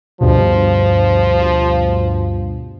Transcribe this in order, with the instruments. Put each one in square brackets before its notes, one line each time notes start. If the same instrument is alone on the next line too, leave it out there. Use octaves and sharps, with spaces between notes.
[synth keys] D2 G2 B2 [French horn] F3